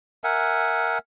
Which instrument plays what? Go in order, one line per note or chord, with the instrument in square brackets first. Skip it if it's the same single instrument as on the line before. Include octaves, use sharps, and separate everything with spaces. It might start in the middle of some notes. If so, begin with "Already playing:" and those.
[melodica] A#4 E5 F#5 G#5